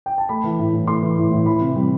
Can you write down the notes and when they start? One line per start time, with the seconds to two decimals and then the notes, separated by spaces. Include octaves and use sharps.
0.06 G5
0.18 A5
0.29 A3 B5
0.44 E3
0.59 A2
0.74 A2
0.88 A3 C6
1.02 E3
1.18 A2
1.31 A2
1.46 E3 B5
1.61 C3
1.76 G3